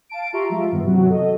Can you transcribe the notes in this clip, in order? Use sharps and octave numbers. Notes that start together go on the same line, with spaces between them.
F5 A5 D7
F4 G4 E5 A#5 C6 C#6
F3 G#3 F4 E5
G2 D#3 B3
C3 E3 F#3 F#4
A4 D#5